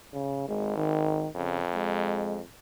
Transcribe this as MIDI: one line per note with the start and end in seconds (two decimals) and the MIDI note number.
0.13 0.46 49
0.48 1.24 32
0.48 0.76 56
0.77 1.27 51
1.35 2.42 41
1.35 1.60 49
1.75 2.39 56